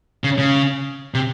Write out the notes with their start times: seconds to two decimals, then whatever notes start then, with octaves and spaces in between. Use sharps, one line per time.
0.24 C#3
0.39 C#3
1.14 C3